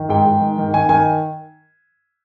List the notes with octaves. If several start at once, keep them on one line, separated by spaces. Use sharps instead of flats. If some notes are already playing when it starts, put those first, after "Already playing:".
Already playing: D#3
G#2 G5
G#2
D#3
D#3
D#3 G#5
D#3 G#5